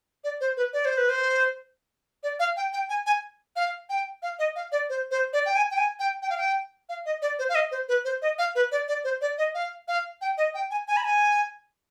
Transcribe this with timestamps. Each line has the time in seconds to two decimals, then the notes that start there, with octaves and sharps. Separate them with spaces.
0.24 D5
0.41 C5
0.57 B4
0.73 D5
0.85 C5
0.97 B4
1.09 C5
2.23 D5
2.40 F5
2.57 G5
2.73 G5
2.89 G#5
3.06 G#5
3.56 F5
3.89 G5
4.23 F5
4.39 D#5
4.56 F5
4.72 D5
4.89 C5
5.11 C5
5.33 D5
5.46 G5
5.56 G#5
5.71 G5
5.77 G#5
5.99 G5
6.22 G5
6.30 F5
6.38 G5
6.89 F5
7.06 D#5
7.22 D5
7.39 C5
7.49 F5
7.55 D#5
7.71 C5
7.89 B4
8.05 C5
8.22 D#5
8.38 F5
8.55 B4
8.72 D5
8.88 D5
9.04 C5
9.21 D5
9.38 D#5
9.55 F5
9.88 F5
10.21 G5
10.38 D#5
10.54 G5
10.71 G#5
10.88 G#5
10.97 B5
11.05 G#5